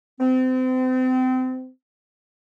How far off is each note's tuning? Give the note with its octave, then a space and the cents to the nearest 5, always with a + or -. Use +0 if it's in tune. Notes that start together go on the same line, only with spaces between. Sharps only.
C4 -30